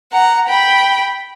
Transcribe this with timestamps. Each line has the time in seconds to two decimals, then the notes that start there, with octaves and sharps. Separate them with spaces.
0.12 F#5 A#5
0.48 G5 B5